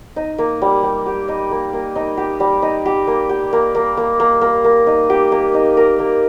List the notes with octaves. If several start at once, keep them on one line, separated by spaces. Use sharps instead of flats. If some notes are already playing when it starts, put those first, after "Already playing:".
D#4
A#3
G3
G3
G4
D#4
A#3
A#3
D#4
G4
G3
D#4
G4
A#3
G4
A#3
A#3
A#3
A#3
A#3
A#3
D#4
G4
A#3
D#4
A#4
A#3